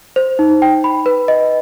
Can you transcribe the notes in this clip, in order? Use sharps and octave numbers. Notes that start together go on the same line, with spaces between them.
C5
D#4
G5
B5
B4
D#5